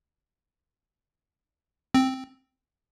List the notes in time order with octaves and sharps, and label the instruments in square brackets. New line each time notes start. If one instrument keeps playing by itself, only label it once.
[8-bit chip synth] C4